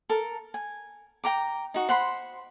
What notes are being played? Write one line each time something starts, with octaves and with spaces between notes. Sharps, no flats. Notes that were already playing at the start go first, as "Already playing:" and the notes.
A4 A#4
G#5
G5 A#5 D6
D#4 F#4
C5 F#5 B5 C6